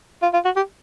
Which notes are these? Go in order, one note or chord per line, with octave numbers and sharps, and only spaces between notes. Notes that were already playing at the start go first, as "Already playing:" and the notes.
F4
F4
F#4
G4